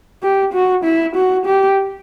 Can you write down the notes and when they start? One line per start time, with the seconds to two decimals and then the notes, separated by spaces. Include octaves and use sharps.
0.23 G4
0.53 F#4
0.84 E4
1.16 F#4
1.46 G4